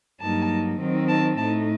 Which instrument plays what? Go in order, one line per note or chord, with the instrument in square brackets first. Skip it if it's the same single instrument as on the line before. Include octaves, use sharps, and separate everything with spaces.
[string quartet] G2 F#3 A#3 D#4 A5
D#3 F#3 C4 D#4
A5
A2 A3 D#4 A5